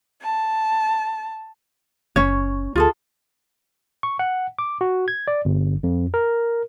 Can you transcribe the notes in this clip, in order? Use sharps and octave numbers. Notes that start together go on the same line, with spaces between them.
A5
F#1 C#4 C#5
D2 F4 G#4 A4
C#6
F#5
D6
F#4
G#6
D5
G1
F2
A#4